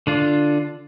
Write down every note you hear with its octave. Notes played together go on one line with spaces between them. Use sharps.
D3 D4 F4